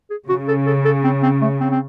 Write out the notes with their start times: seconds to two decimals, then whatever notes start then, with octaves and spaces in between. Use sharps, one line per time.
0.10 G#4
0.29 C#3 F#4
0.48 A4
0.67 A4
0.85 A4
1.04 C4
1.23 C4
1.41 A3
1.61 C4
1.71 C4